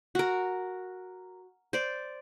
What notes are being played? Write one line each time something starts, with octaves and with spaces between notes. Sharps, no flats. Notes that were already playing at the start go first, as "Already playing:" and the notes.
F#4 A#4
C5 D5